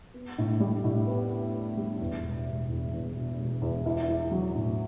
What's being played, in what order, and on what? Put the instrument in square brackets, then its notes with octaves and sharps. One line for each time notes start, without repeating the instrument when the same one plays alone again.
[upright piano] B3
A2
G3
A2
B3
B3
B3
G3
E2
E1
E1
E2
E2
B2
E1
E2
E4
E4
F#3
A2